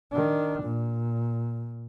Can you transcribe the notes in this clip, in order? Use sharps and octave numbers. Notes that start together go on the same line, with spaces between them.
D#3 D4
A#2